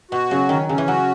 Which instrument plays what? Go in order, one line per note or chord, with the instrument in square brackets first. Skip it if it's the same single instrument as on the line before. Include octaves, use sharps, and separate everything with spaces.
[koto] B2 [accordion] F#4
[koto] C#3 [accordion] F#3
[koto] D#3 [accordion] C#4
[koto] C#3 [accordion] C#4
[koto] E3
[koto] F#3 [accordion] F#4